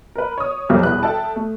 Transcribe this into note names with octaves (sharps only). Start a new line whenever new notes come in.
A#4 B4
C#5 D#6
B1 F2 F3 G4 A#4 C#5
E2 B2 G3 B4 F#6
A4 E5 G5 A5
A3